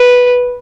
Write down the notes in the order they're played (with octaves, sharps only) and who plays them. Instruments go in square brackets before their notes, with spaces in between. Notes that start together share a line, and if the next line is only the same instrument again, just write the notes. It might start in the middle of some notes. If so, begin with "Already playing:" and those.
Already playing: [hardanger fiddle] B4